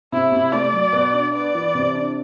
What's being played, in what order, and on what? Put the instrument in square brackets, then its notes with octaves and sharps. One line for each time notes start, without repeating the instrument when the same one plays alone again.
[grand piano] C3 [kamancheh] E4
[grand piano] C3
[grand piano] A3 [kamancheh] D5
[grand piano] F#3
B2
D4
[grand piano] B3 [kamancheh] D5
[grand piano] E3
C3
D4